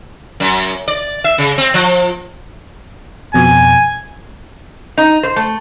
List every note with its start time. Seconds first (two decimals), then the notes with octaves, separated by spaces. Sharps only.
0.40 F#2
0.88 D5
1.24 E5
1.38 C#3
1.58 C4
1.74 F3
3.34 F2 B2 G#5
4.98 D#4
5.23 C5
5.36 A3